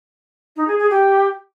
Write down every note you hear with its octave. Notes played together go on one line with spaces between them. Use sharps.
D#4
G#4
G#4
G4